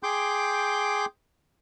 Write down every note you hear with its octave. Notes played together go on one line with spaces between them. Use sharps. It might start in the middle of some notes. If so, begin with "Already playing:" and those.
G#4 G5 C6 D6 G6